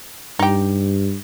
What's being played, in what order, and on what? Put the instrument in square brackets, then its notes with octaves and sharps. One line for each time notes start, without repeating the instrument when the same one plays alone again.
[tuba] G2 [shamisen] D#4 G4